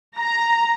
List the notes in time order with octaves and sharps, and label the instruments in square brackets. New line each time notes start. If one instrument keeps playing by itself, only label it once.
[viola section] A#5